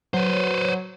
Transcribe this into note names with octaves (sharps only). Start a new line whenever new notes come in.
F#3 B4 C5